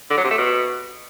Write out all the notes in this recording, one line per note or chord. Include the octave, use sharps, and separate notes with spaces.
D3
F#3
C3
A3
B2